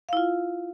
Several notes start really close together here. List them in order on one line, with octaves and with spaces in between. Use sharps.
F5 E4 F4